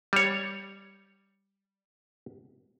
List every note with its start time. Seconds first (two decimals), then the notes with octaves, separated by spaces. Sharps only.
0.13 G3 C#5